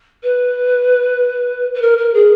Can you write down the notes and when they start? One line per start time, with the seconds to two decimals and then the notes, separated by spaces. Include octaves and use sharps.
0.23 B4
1.74 B4
1.81 A#4
1.97 A#4
2.13 G#4